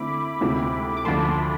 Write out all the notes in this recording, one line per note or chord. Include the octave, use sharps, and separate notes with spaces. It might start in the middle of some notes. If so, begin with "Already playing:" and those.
Already playing: D3 A3 C4 E4 B5 D6
D2 C3 G#3 C4 E4
D6
D2 D3 F3 A3 A5 C6